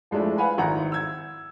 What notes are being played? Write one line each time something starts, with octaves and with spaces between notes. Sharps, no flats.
F3 G#3 A3 D4 E4
B4 F5 F#5 G#5 B5
G#1 E4 F#5 A#5
E6 G#6